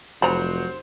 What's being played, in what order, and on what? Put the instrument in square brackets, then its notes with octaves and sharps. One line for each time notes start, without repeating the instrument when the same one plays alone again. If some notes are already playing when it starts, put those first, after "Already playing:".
[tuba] F1 [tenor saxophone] F#3 [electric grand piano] C5 [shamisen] A#5 B5